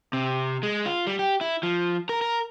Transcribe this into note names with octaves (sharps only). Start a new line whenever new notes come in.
C3
G#3
F4
G3
G4
E4
F3
A#4
A#4